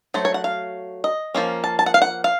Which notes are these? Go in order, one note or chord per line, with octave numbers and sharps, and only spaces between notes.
F#3 A3 C5
C#5
F#5
F5
D#5
F3 A#3 C#4
A5
A5
F#5
F5
F#5
F5